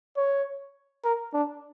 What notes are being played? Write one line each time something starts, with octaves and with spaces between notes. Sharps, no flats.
C#5
A#4
D4